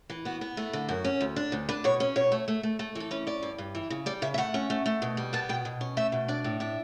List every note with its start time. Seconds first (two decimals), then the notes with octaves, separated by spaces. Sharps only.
0.10 E3
0.25 B3 F#4
0.41 B3
0.57 A3
0.73 D3
0.89 F#2 F#4
1.04 C#4
1.21 D2
1.36 D4
1.52 D2
1.69 D4 B4
1.84 B2 C#5
2.00 C#4
2.16 B2 C#5
2.32 A3
2.48 A3
2.63 A3
2.79 A3
2.95 E3 A4
3.11 C#4 B4
3.27 C#4 D5
3.43 G2
3.58 G2
3.75 E3
3.90 C#3
4.06 G3 D5
4.22 C#3 E5
4.34 E5
4.38 A3 F#5
4.54 C#4
4.70 A3
4.86 A3
5.02 B2
5.17 G3
5.33 B3 A5
5.49 B2 G5
5.65 B2
5.81 C#4
5.97 A3 E5
6.12 B2
6.28 D4 D5
6.44 A2
6.60 D4 E5